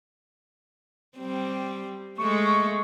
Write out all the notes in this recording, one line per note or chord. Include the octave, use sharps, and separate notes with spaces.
G3 C4
G#3 A3 C#6